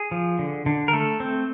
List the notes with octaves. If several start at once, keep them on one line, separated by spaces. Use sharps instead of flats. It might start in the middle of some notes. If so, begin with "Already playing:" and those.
Already playing: G#4
F3
D3
D3
A#4
A3 A4
C4